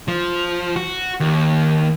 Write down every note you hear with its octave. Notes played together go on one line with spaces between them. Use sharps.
F3
F#4
D#2